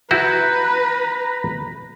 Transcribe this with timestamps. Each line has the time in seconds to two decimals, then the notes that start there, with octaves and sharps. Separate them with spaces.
0.11 E4 F#4 B4 A#5 B5 G6